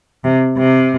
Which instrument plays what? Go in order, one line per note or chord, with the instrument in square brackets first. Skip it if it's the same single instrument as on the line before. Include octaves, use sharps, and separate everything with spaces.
[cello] C3
C3